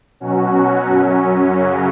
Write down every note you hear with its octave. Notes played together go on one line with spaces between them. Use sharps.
B2 F#3 C#4 F#4
F#2 F#3 C#4
F#2 C#3 F#3 C#4